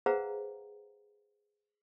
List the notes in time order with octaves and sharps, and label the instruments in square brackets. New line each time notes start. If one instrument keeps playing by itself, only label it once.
[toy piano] G#4 B4 C5 F5 F#5 A#5